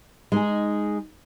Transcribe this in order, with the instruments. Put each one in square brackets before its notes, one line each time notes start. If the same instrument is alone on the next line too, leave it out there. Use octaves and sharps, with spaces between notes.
[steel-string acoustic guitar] G#3 D#4 G#4